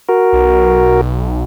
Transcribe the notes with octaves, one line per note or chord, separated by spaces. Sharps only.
F#4 A#4
B1